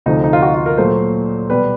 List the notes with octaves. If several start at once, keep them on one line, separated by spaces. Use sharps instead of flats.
D2 C3 F3 A3 D#4
D#4
F4
F#4
F4
A#4
A#2 F#3 A3 C5
B2 G3 B4